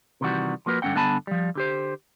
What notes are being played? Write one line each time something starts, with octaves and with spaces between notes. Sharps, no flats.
C3 D#3 E3 G3 F#4
F3 A#3 F#4 B4
G2 D3 C4 C#4 F#5 G5
G2 D3 B3 G#5 A5 B5
F3 G3
D3 G4 C5